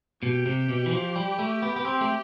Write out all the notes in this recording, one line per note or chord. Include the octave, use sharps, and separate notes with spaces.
B2 G4
C3
B2
E3
F3
G3
A3
B3
B3
C4
A3